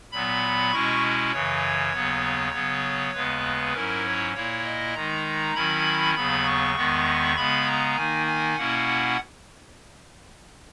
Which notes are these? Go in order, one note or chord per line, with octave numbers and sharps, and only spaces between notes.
A#2 F#3 B3 B5
B2 G#3 C#4 E4 C#6
F#2 C#3 E3 C#5
D#2 C#3 F#3 B3
C#3 F#3 B3
D#2 C#3 G#3 B3 B4
G#2 F#3 C#4 E4 A#4
C#5
A#2 A#3 E4 C#5
D#5
D#3 G#3 D#4 A#5
D#3 F#3 C#4 E4 B5
D#2 C#3 F#3 B3 B5
C#6
E2 D#3 G#3 B3
C#3 G#3 B3 B5
A#5
D#3 A#3 D#4 G#5
G#5
B2 A#3 C#4 E4 F#5